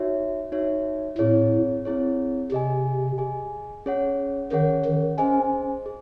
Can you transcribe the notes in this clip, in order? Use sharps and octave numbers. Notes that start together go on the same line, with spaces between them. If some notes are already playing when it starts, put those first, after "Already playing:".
Already playing: D#4 F#4 C#5 E5
D#4 F#4 C#5 E5
A2 C4 E4 G#4 C#5
C4 E4 G#4 C#5
C3 G#4 D#5 G#5
G#4 D#5 G#5
C#4 G#4 C#5 F#5
D#3 C#4 G#4 C#5 F#5
D#3
C#4 G#4 C5 D#5 G#5
G#4